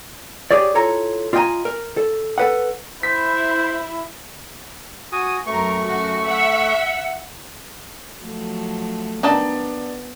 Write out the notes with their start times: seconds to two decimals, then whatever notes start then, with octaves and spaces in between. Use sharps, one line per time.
0.51 G4 G#4 C#5 D5
0.75 E4 F4 A4 C#5 A#5
1.33 F4 D5 D#5 G5 G#5 A#5
1.65 A#4
1.97 A4
2.38 A4 B4 F#5
3.03 E4 C5 B6
5.12 F#4 G#5 D#6
5.47 F#2 A3 A#4 C#6
5.84 F#2 F#4
6.26 E5 F#5
8.19 F3 F#3 A3
9.23 D#3 B3 D4 D#4 A5